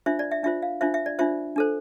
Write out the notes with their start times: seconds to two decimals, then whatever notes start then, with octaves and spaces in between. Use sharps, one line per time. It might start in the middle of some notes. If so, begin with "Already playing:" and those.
0.06 D4 F4 C5 E5
0.19 D5
0.31 E5
0.43 D4 F4 C5 E5
0.62 F5
0.81 D4 F4 C5 E5
0.94 E5
1.06 D5
1.19 D4 F4 C5 E5
1.56 D4 A4 C5